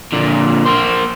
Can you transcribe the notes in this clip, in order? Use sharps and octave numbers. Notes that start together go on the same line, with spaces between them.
A#2 D3
A#3 C5